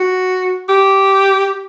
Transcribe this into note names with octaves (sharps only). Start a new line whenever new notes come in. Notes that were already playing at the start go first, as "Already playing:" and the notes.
Already playing: F#4
G4